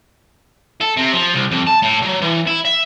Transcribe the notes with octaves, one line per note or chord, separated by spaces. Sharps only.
A4
C3
F3
C2
F2
A5
A2
F#3
E3
E4
E5